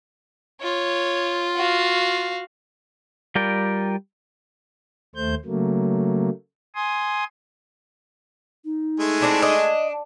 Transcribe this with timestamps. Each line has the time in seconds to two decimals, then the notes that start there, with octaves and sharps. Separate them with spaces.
0.62 F4 C#5
1.57 F#4 F5
3.35 G3 F4 A#4 D5 G5
5.15 D#2 A3 C5 G6
5.45 C#3 F#3 A3 A#3
6.75 G#5 C6 D#6
8.64 D#4
9.00 G#3 A3 G#5
9.21 C4 D4 E4
9.42 D4 D#5